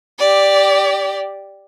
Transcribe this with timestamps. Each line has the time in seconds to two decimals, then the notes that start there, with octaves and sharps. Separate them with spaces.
0.19 G4 D5